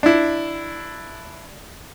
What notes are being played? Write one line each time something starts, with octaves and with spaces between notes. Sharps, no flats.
D4 E4